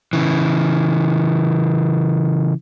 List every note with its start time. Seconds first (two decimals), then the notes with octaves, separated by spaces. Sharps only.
0.13 C#3 E3